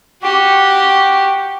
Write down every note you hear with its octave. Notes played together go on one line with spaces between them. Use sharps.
F#4 G4